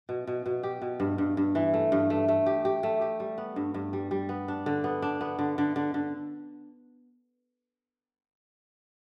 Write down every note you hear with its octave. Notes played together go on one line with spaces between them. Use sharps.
B2
B2
B2
G4
B2
G2
G2
G2
E3
A3
G2
A3
A3
G4
G4
A3
G4
G3
B3
G2
G2
G3
G3
B3
D4
D3
B3
D4
B3
D3
D3
D3
D3